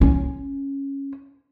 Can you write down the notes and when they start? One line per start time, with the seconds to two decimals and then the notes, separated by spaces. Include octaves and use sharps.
0.01 C#4